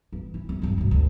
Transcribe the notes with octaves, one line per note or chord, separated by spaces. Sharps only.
E3
E4
G#3
D2 G2
G2 B2
D2 G#3